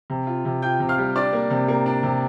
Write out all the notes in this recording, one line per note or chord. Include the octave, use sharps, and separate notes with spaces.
C3
F4
C3
F4 G5 G6
C3
F5 F6
G3
D4 D5 D6
A#3
C3
A#3
D4
C3